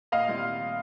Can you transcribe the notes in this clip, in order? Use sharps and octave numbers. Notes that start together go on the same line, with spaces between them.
A#2 D#5 F5
G3 C4 E4